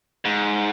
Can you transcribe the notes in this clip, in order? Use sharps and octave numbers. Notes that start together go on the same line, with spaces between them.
G#2